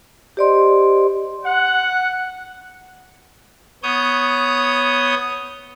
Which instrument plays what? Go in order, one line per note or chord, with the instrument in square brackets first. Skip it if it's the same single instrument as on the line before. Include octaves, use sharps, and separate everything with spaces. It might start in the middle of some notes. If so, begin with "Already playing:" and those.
[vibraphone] G4 C5 D5 D#5 C6
[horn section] F#5
[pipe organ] B3 C#5 D#6 G6